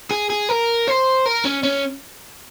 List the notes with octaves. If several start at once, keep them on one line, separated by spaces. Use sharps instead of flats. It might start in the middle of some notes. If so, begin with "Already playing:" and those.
G#4
G#4
A#4
C5
A#4
C#4
C#4